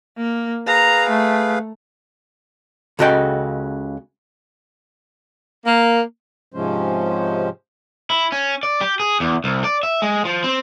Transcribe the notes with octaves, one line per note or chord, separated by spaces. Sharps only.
A#3
G#4 B4 F5 A#5
A3
C#2 C#3 F#4 A4 D#5 G5
A#3
G#2 C3 F3 G#3 C#4 C5
E4
C#4
D5
G4
G#4
E2
C2
D5
E5
G#3
F3
C4